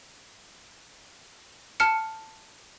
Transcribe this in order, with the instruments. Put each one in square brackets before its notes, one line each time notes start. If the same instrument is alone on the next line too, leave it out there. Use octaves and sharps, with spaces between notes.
[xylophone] A5 F6 C#7